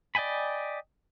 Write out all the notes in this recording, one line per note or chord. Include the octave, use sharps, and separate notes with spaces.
D5 D#5 G5 G#5 B5